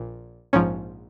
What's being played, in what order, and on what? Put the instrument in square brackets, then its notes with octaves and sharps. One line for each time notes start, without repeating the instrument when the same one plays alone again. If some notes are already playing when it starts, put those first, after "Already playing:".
Already playing: [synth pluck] A#1 A#2
A#1 G#2 F3 C#4